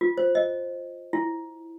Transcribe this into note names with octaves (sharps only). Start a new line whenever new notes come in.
F4
C5
D#5
E4